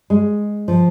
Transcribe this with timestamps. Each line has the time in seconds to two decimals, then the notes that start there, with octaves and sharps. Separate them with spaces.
0.10 G#3
0.68 F3